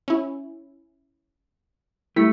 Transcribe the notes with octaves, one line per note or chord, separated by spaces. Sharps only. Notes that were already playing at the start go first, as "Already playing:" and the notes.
C#4 E4
G3 A3 E4 B6